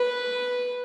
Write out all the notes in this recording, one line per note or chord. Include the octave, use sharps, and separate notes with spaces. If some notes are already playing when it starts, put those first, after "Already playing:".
Already playing: B4